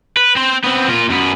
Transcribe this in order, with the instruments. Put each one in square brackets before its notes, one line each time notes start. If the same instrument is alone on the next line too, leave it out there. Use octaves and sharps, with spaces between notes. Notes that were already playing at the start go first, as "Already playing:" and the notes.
[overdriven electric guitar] B4
C4 C5
B3 C4
A#2 F4
F#2 B3